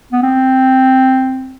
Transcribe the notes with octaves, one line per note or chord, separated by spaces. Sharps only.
B3
C4